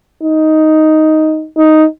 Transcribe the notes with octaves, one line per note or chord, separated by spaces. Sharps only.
D#4
D#4